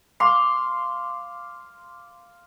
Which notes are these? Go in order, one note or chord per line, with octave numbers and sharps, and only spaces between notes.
F5 C6 D6